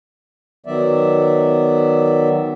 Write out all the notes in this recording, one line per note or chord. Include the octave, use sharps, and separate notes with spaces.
D#3 F#3 B3 D5 E5